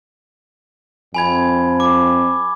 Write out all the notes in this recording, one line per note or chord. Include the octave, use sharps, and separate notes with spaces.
F2 G#5 B5 G#6
D6